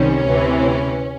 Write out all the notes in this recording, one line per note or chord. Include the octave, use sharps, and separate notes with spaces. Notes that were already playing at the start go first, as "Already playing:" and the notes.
Already playing: C2 D#3 G3 C4 C#4
D2 C3 E3